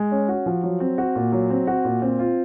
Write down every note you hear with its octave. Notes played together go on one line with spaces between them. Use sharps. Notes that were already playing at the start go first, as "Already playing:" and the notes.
Already playing: G#3
C#4
F#4
F3
F#3
C4
F#4
A#2
F#3
C4
F#4
A#2
C4
F4